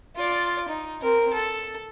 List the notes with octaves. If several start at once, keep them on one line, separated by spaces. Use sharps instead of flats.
F4 D5
D#4
C4 A#4
A4